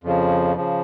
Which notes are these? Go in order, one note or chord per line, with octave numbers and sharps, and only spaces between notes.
F2 C#3 F3
C#3 F3